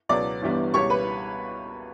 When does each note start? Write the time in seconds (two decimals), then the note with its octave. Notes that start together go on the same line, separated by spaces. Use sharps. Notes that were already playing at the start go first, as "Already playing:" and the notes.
0.09 C#2 B2 F#3 B3 D5 D6
0.42 G1 G2 E3 G3 B3
0.73 C#2 B2 G3 C#5 C#6
0.90 B4 B5